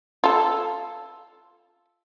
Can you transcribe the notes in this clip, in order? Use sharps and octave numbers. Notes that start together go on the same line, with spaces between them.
F4 A4